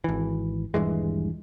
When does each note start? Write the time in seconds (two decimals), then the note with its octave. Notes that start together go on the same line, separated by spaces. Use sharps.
0.04 G#1 E3
0.74 D#1 G2 E3 G#3